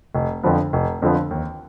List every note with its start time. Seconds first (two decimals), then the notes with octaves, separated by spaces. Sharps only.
0.15 F1
0.43 F2 D3 F3 B3
0.73 F1
1.02 F2 D3 F3 B3
1.31 D#2